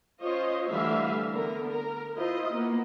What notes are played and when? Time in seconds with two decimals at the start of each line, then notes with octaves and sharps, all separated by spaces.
0.21 C#4 F4 C5 C#5 D#5
0.70 D3 E3 G3 A3 E5 F5
1.31 D3 B3 A#4
1.71 A#4
2.15 E4 F4 C5 D#5
2.52 A#3 B3 F4